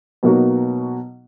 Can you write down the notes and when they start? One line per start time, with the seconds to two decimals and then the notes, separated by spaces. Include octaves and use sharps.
0.23 B2 F#3 A#3 D#4 F#4